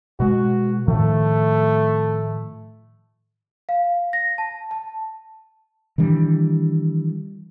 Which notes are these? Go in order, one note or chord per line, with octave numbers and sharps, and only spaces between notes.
B2 G#3 F#4
A2 D#3 F3 A3
F5
A#6
A5
A5
D#3 E3 G3 D4